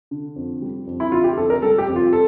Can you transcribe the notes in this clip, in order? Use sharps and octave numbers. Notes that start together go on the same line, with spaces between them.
D3
F2
G3
F2
E4
D3 F4
G4
F2 A4
A#4
G3 A4
G4
F2
F4
A4